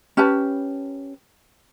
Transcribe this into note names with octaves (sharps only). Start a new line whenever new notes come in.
C#4 G4 B4 A5